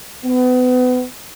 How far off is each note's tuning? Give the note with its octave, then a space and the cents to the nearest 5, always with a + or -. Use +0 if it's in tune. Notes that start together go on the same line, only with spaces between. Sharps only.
B3 +30